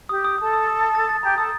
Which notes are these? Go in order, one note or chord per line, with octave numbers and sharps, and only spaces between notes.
G4 D#6
D#6
A4 D#6
D#6
D#6
D#6
A6
A6
G4 A#5
A4 D#6